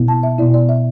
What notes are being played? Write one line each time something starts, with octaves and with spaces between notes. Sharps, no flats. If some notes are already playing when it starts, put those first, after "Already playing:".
Already playing: B2 B3 E4
A5
E5
B2 B3 E4 D5
D5
E5